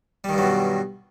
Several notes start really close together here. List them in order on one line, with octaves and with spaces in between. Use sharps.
G3 D#3 G2 F#3 B2